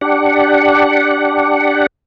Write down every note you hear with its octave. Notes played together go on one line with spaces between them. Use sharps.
D4 G4 F#5